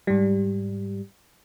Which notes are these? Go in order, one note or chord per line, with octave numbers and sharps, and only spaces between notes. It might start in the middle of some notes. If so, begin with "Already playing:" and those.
G#2 G3